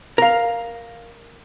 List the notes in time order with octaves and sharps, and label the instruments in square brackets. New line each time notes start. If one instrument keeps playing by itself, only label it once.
[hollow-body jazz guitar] A#4 F5